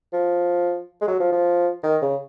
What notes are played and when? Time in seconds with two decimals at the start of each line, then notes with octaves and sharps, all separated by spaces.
0.13 F3
1.01 G#3
1.08 F#3
1.20 F3
1.32 F3
1.83 D#3
2.02 C#3